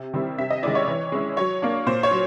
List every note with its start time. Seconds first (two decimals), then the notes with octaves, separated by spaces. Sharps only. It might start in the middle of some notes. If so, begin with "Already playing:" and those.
Already playing: C3
0.14 D#3 G3 C4 E4
0.38 C3 E5
0.50 D#5
0.63 D#3 G#3 C#4 E4 D5
0.75 C#5
0.88 E3
1.12 G#3 C#4 E4
1.37 F#3 C#5
1.62 A#3 D4
1.86 A#2 C5
2.03 C#5
2.11 F#3